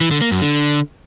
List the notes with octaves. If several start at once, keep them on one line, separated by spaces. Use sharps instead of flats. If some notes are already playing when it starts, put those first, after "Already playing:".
E3
D3
A#3
F#2
D3